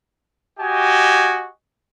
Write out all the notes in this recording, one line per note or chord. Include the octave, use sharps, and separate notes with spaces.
F#4 G4 D#5 G#5